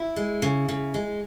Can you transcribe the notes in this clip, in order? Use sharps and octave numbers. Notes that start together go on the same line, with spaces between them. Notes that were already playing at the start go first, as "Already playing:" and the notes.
Already playing: E4
G#3
C#3
C#3
G#3